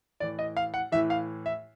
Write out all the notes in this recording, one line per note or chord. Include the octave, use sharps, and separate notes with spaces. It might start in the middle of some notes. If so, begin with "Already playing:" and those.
A2 E3 D5
D#5
F5
F#5
A2 E3 E5
F5
E5